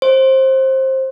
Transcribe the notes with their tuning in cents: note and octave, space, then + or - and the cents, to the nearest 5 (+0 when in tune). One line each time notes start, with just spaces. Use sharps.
C5 +20